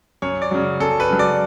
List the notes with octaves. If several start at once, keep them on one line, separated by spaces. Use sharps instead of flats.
F#2 C#5
D5
C#3 F#3
F#2 A4
B4
C#3 F#3
D5